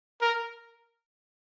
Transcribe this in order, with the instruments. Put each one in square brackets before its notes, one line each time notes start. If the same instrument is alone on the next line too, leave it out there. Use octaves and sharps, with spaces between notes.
[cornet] A#4